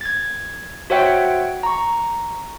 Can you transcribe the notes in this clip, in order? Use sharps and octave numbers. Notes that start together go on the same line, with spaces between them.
G#6 A6
F#4 C5 C#5 E5 F#5 G5
A#5 C#6